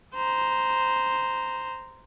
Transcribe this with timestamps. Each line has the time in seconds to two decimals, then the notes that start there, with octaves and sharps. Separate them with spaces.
0.15 C5 A#5